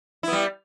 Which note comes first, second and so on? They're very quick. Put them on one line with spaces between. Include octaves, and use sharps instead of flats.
E4 B3 G3